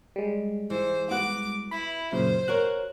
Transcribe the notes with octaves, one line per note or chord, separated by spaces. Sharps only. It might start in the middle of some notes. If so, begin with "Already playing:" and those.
G3 G#3
E3 C5
B3 F#4 F#5 D6
E4 B5
F#2 A#2 C#3 C5
F#4 A#4 C#5 F#6